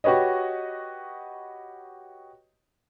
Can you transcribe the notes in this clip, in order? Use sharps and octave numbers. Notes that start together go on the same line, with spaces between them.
F#4 G4 B4 C#5 D#5